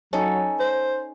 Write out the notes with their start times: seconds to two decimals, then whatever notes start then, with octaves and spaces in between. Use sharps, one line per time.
0.13 F#3 C#4 D#4 A4
0.60 C5